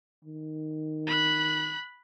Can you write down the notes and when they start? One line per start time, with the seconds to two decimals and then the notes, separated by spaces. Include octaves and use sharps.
0.25 D#3
1.07 B5 F#6